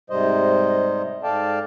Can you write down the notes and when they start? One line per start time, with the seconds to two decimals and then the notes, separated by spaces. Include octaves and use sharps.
0.10 G#2 C3 G3 C5 D#5
1.23 G#2 A4 D5 F5 G5 A5